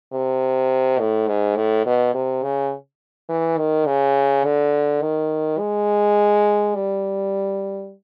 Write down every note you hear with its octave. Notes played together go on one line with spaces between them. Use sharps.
C3
A2
G#2
A2
B2
C3
C#3
E3
D#3
C#3
D3
D#3
G#3
G3